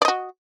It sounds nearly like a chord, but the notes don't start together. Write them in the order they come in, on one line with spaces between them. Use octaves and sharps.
D5 D#5 F#4